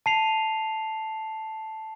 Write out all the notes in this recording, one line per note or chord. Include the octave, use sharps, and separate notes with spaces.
A5 C7 F7